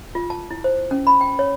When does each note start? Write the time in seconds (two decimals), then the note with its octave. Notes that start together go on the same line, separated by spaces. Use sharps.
0.15 F4
0.30 A5
0.51 E4
0.64 C5
0.91 C#4
1.07 B5
1.21 G5
1.39 C#5